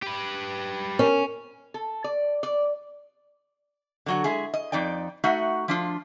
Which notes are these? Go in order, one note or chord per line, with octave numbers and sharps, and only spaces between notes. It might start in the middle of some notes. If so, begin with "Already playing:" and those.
G4 B4
C#4 A#4
A4
D5
D5
D3 F#3 F#4
G#3 E4 G#4
D#5
F2 D#4 D5 G5
A3 D#4 F#4 E5 F#5
F3 D4 F4